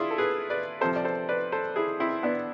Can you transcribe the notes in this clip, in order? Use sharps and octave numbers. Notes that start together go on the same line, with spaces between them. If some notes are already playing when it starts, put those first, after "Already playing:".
Already playing: D4 E4 F4 G#4
A4
G#4 B4
B4 D5
C3 F3 A4 C5
D5
A4 C5
B4 D5
A4 C5
E4 G#4
C4 E4
B3 D4